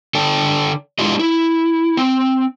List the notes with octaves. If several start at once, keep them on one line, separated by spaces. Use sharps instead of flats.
D3 A4 D5 G5 A5
G#3 D4 E4 F4 G4 D#5
E4
C4